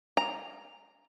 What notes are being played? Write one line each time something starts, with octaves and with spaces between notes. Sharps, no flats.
A#5